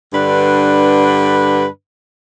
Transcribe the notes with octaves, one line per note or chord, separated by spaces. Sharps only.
G2 D3 D4 B4